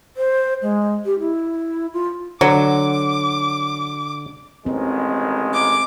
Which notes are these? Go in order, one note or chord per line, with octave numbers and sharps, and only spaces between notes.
C5
G#3
G4
E4
F4
D3 F#3 D6
A1 D#3 G#3 C4
D6